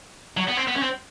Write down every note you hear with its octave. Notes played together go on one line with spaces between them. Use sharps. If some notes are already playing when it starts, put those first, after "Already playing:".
F#3
B3
C4
B3
C#4
C4